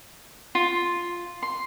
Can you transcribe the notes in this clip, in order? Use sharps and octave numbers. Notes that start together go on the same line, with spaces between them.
F4
C6